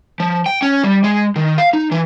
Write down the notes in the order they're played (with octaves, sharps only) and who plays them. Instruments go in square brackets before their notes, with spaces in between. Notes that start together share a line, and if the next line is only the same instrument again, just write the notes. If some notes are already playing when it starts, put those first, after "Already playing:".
[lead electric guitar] F3
G5
C#4
G3
G#3
D#3
F5
D#4
E3